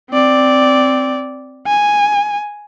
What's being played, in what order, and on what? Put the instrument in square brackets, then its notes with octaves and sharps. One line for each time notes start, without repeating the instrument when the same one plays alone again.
[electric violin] C4 D5
G#5